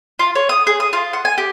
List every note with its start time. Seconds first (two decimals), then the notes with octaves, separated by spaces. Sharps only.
0.19 F4
0.35 C#5
0.49 D#6
0.67 G#4
0.80 D#6
0.93 F4
1.13 F#5
1.25 G#5
1.38 G4